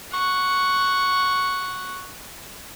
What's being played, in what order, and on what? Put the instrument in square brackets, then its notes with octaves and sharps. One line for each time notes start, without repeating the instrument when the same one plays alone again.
[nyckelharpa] F#5 C#6